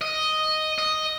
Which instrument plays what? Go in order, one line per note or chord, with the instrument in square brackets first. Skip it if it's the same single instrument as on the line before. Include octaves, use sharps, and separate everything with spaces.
[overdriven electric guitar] D#5
D#5